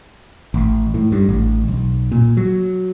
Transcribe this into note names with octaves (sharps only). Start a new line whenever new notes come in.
A1
A2
G2
A1
B1
A#2
F#3